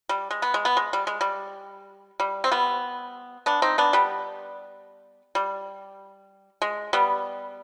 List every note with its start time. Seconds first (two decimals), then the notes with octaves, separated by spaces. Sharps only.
0.09 G3
0.31 G#3
0.42 B3
0.54 G#3
0.65 B3
0.77 G#3
0.93 G3
1.07 G#3
1.21 G3
2.20 G3
2.44 C4
2.51 G3 B3
3.46 B3 D4
3.62 C4 D#4
3.78 B3 D4
3.93 G3 B3
5.35 G3
6.62 G#3
6.93 G3 B3